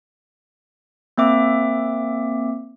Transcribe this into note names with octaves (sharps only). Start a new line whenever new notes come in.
A#3 C4 E5 D6